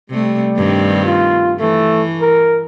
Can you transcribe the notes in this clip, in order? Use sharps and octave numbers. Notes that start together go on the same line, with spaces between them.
C3 G3 A3
G2 D#3 C4
F4
E3 A3
A#4